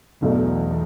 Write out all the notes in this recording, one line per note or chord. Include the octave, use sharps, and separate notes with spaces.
B1 E2 B2 F#3 A3 D4